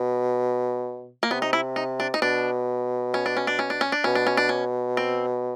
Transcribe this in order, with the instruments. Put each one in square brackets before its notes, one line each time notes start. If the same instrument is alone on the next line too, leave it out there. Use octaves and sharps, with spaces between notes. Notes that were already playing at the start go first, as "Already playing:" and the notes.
Already playing: [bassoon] B2
[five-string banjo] A#3
[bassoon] C3 [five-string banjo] B3
[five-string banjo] D#4
E4
D#4
D4
D#4
[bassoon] B2 [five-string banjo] D4
[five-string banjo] C#4
D4
C#4
D4
C#4
D4
C#4
D4
[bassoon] B2 [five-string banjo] C#4
[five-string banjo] D4
C#4
D4
C#4
C4